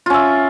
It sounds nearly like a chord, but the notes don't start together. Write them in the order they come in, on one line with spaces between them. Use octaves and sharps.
F4 C#4 E5